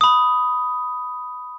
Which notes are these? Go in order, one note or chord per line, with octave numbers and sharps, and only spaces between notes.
B5 D#6